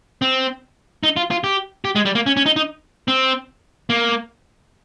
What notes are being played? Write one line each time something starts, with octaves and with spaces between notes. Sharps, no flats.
C4
D#4
F4
F4
G4
G4
G#3
G3
A#3
C#4
C#4
D#4
D#4
C4
A#3